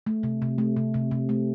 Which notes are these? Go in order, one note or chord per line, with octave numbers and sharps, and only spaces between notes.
A3
C3
C3
A3
C3
C3
C3
A3